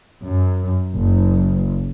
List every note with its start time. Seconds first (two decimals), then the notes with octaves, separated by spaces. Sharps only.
0.23 F#2
0.94 F#1